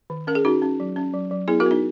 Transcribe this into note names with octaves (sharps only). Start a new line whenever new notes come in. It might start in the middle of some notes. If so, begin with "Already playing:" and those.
D#3
C#4 A#4
G#4
C#4 D#4 F#4
C#4
F#3
C#4
F#3
F#3
B3 E4 G#4
F#4 A#4
B3 D#4